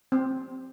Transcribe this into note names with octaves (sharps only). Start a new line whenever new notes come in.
C4